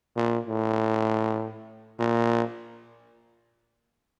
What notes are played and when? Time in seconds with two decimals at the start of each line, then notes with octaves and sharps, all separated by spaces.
0.16 A#2
0.46 A2
2.00 A#2